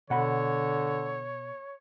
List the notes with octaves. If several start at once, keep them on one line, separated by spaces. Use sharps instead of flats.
B2 D3 C#5 F#5 B5